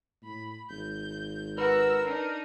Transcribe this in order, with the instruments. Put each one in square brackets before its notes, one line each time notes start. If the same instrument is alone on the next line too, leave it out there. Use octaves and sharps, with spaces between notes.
[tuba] A2 [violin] B5
[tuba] G#1 [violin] G6
[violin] F#4 E6 [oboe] A#4 [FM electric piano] B4
[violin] D4 D#4